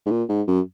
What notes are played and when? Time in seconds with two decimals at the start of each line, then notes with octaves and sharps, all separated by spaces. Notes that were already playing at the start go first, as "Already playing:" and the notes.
0.06 G#2
0.11 A#2
0.29 G#2
0.47 F#2